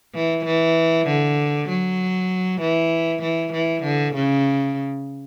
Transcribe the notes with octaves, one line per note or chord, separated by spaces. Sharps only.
E3
E3
D3
F#3
E3
E3
E3
D3
C#3